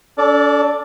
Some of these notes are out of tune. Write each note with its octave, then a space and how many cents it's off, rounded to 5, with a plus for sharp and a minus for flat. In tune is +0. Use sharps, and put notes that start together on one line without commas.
D4 -45 A4 -5 D5 +0